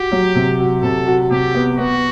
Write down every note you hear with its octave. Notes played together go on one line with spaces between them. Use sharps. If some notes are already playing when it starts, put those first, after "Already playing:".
Already playing: F#4 G4
F#3
C3
F#4
C3 A4
F#4
C3 G4
B3
B3 F#4